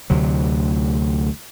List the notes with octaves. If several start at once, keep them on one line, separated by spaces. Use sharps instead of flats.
D2 C3 F#3